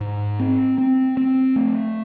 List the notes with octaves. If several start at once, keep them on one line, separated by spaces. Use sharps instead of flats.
G#2
C4
C4
C4
A3